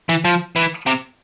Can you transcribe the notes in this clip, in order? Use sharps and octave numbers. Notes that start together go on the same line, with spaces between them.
E3
F3
E3
C3